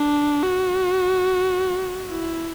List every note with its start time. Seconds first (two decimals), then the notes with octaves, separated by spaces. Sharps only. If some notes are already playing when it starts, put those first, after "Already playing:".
Already playing: D4
0.43 F#4
2.10 E4